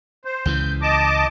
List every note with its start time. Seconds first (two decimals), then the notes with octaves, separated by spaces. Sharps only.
0.25 C5
0.45 C#2 C#3 E3 G6
0.82 D#5 A5 D6